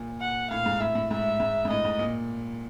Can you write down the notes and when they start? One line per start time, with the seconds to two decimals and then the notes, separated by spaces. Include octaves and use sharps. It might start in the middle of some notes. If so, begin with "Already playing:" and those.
Already playing: A#2
0.20 F#5
0.50 A2 F5
0.66 G#2
0.80 A2 E5
0.95 A2
1.10 G#2 E5
1.40 G#2
1.65 G#2
1.70 A2 D#5
1.85 G#2
1.99 A#2